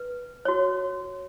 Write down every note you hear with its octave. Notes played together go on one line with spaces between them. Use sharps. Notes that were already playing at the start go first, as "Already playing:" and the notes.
Already playing: B4
F#4 C#5